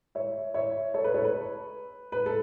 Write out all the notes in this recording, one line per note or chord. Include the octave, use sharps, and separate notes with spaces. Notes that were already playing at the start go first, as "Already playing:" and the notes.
C#5 E5
C#5 E5
A4 C#5
B4
A4 C#5
B4
B4
A4